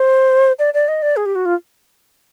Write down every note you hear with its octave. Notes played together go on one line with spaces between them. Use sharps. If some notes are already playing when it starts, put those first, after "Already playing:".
Already playing: C5
D5
D5
D#5
D5
G#4
G4
F#4
F4